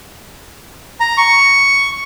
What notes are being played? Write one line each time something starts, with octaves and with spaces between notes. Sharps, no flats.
A#5
C#6